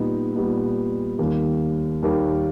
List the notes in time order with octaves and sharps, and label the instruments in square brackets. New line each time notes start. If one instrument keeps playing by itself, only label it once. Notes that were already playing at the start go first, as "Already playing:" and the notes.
Already playing: [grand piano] A#2 G3 B3 D#4
A#2 G3 B3 D#4
D#2 D#3 G3 A#3
D#2 D#3 G3 A#3